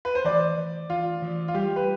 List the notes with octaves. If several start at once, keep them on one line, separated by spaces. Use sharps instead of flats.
B4
C5
E3 D5
E3
E3 F4
E3
F4
G3 G4
B4